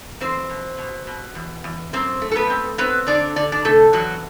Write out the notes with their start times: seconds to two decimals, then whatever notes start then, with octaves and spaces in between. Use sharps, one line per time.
0.21 E2 C4 C5
0.50 B2
0.78 B2
1.07 B2
1.35 E2
1.64 E2
1.93 F#2 C4 C5
2.22 A3
2.31 A4
2.36 B3 B4
2.50 C4
2.78 B3 C4 B4
3.07 D3 D4 D5
3.36 D3 D5
3.52 D4 D5
3.65 C3 A3 A4
3.93 E2 F#3 F#4